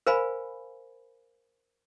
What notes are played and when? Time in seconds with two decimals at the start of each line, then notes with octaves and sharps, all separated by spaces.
0.06 A#4 C5 F5 G#5 B5